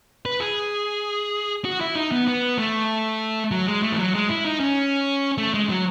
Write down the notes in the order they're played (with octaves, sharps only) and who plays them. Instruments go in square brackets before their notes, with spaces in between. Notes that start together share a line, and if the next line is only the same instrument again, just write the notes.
[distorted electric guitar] B4
G#4
F#4
E4
D#4
B3
B3
A3
F#3
G#3
A3
E3
F#3
G#3
E4
D#4
C#4
A3
G#3
F#3